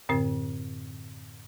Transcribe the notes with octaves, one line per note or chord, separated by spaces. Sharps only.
F#2 A2 D3 C4 A#4